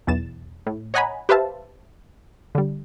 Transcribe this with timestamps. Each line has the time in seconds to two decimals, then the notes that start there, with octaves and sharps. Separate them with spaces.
0.07 B1 E2 A6 E7
0.67 A2
0.94 C#5 D#5 F#5 G#5 A#5 B5
1.29 G4 B4 C5 E5 F5 A5
2.55 D3 G3